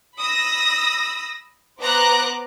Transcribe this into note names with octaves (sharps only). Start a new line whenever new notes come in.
B5 D#6 E6 A#6
B3 C5 A#5 D6 F#6